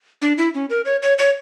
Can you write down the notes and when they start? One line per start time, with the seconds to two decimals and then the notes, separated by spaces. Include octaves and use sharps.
0.22 D4
0.38 E4
0.54 C#4
0.70 A#4
0.85 C#5
1.02 C#5
1.18 C#5